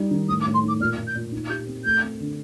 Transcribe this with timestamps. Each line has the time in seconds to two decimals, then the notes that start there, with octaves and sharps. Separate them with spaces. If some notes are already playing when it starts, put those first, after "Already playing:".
Already playing: G3 D#4
0.11 D#3
0.28 A2 D#6
0.41 D6
0.46 A2
0.54 C6
0.63 D#4 D6
0.80 A#2 F6
0.98 A#2
1.07 G6
1.15 A#2
1.32 D#4
1.49 G4 G6
1.67 C4
1.84 A3 G6
2.03 C4
2.20 D3